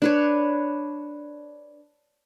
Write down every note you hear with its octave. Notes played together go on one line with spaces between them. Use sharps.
D4 B4 C#5